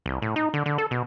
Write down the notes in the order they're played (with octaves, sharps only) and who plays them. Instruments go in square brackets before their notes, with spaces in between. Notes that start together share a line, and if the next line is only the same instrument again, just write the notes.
[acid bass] C2
A2
D#4
D3
D3
A4
B2